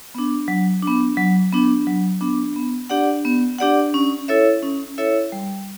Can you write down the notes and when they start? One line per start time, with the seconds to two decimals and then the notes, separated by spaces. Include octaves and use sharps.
0.15 B3 D4
0.48 F#3
0.82 B3 D4
1.17 F#3
1.52 B3 D4
1.87 F#3
2.21 B3 D4
2.56 B3
2.90 D4 G4 D5 F#5
3.25 B3
3.59 D4 G4 D5 F#5
3.94 C#4
4.28 E4 A4 C#5 E5
4.63 C#4
4.98 E4 A4 C#5 E5
5.32 G3